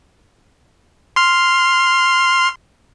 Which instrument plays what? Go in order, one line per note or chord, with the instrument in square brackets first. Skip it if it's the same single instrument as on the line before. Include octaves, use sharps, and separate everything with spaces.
[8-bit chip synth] C6 F6